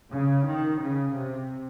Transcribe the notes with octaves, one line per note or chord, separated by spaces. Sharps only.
C#3
D#3
C#3
C3